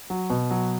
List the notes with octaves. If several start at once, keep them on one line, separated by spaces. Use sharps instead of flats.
F#3
B2
F#3